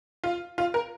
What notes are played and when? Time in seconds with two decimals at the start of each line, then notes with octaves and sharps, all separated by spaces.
0.24 F4
0.58 F4
0.74 A#4